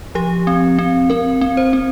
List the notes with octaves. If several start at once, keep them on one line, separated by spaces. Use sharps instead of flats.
F3 G4
C4
C4
C4 A#4
C4
C5
C4